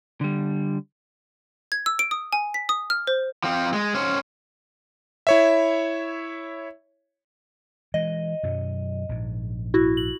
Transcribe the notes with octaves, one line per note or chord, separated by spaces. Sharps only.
D3 G3
G#6
E6
D7
D#6
G#5
B6
D#6
F6
C5
F3 C4
G#3
C#4 C5
E4 C#5 E5
E3 G#3 D#5
F#2 B2 F#3
A#1 G#2
E4 F#4
F#7